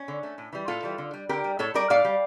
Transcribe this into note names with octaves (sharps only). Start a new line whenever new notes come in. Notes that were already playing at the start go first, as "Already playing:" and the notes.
Already playing: C#4
D3
A3
A2
E3 G3
A2 F4 A4
E3 G3
D3
G3
D3 G4 A#4
G3
A2 A4 C#5
G3 A#4 D5
A2 D5 F5
G3